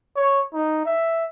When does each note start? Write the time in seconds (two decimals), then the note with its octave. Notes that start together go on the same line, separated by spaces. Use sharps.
0.16 C#5
0.54 D#4
0.86 E5